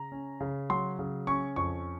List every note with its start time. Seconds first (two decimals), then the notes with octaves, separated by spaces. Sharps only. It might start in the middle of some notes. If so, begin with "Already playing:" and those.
Already playing: C#3 A#5
0.12 C#4
0.40 C#3
0.70 F#3 C6
0.99 C#3
1.27 C#4 C#6
1.56 F2 C#6